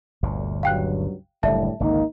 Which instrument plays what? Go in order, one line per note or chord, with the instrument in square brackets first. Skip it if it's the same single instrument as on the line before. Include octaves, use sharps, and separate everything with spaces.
[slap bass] G1 D2 A#2
[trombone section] C#2 G2 F#3 [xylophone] F5 G5 F#6
[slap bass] F#1 [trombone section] A2 D3 G3 [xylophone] D5 E5 A5
[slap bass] G#1 C#2 D3 [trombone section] A#3 D#4